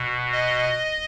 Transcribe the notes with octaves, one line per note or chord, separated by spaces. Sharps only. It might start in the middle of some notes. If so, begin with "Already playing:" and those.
Already playing: B2
D#5